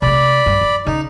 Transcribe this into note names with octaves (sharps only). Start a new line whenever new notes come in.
C3 A3 D5 B5
G2
F3
C#3 D#4